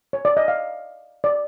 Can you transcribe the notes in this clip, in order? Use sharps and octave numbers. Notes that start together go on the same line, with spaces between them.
C#5
D5
D#5
F5
D5